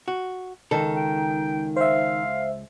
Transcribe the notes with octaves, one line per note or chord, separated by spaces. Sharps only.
F#4
C#2 D#3 A4
G5
C5 E5 F5